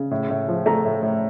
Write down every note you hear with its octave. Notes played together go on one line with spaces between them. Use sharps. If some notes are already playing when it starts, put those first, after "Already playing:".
Already playing: C#3
A2
A2
F3
A3 A#5
A2
A2